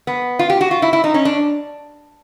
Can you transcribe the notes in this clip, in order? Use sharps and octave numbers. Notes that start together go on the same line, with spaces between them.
B3
F4
G4
F#4
F4
E4
E4
D#4
C#4
D4